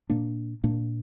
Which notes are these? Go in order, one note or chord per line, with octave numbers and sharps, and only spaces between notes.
A#2 A#3 D4
A#2 A#3 D4